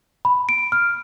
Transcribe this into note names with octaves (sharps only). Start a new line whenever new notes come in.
B5
D7
F6